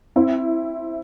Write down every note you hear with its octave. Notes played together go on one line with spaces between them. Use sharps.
C4 E4